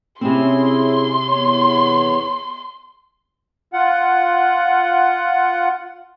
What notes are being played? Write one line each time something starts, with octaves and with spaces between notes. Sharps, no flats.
C3 C4 C#4 E4 G#4 C6
E2 C#5
F4 F#5